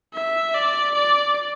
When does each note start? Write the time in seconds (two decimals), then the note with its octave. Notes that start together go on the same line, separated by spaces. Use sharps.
0.14 E5
0.55 D5
0.94 D5